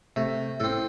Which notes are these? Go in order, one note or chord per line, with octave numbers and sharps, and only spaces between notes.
C3 A3
A2 C4 A4